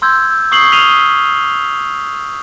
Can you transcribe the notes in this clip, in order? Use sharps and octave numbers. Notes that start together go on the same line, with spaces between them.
C6 E6 G6 G#6
C#6 D#6 C7 F#7 G7
F6 B6 D#7 F7 G7